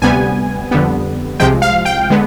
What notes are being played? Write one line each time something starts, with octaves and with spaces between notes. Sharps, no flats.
D2 C3 G3 B3 G#5
F2 D3 G3 B3
C2 C3 F3 G#3 G5
F5
G5
D3 G#3 B3